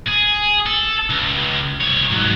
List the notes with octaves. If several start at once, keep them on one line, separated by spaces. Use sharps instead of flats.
G#4
A4
C#2
C2 C#5
G#2 F#3